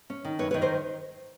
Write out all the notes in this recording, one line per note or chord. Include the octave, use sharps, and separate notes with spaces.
C#4
D#3
F#2 B4 C#5
D#3 B4 C#5
A#4 C5